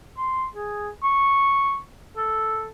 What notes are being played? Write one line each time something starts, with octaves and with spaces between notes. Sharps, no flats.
C6
G#4
C#6
A4